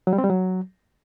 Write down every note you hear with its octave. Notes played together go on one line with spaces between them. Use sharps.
F#3
G3
C4
G3
F#3